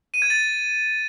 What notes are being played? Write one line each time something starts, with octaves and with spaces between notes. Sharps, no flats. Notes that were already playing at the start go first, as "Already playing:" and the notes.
D#7
G#6
A6